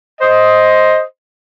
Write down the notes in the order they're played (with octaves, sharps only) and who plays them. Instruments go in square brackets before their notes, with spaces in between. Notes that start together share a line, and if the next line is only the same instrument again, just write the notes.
[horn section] C5 D#5